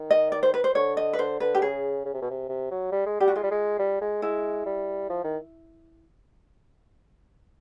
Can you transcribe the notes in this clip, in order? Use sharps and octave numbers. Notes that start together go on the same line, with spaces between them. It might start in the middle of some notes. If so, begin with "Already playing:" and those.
Already playing: D#3
D#5
D5
C5
B4
C5
D3 C#5
D#5
B4
D3 C5
D3 B4
G4
C#3 G#4
C#3
C3
B2
C3
C3
F#3
G3
G#3
G3 G4
F#4
G#3 F4
G3
G#3
G3
G#3
G#3 E4
G3
F3
D#3